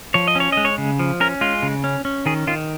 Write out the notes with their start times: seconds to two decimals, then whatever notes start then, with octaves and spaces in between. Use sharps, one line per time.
0.14 F3 C#5
0.27 D#5
0.36 C#4 C#5
0.52 G#3 D#5
0.65 C#5
0.78 C#3
0.99 F3
1.20 C#4 A#4
1.41 G#3 F4
1.63 C#3
1.84 C#4
2.05 C#4
2.26 D#3 G#4
2.47 D#3 F4